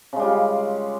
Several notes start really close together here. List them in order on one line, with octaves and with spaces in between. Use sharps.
C#3 G#3 G3 F4